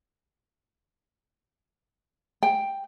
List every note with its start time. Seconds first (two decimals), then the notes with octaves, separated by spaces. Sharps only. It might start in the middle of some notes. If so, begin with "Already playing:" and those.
2.43 G5